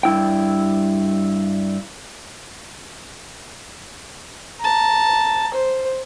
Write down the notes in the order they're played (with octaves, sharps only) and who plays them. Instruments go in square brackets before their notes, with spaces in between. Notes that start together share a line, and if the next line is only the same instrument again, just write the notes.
[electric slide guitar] G2 E4 G5
[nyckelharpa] A5 A#5
C5